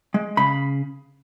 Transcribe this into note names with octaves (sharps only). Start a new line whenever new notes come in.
G#3
C#3 B5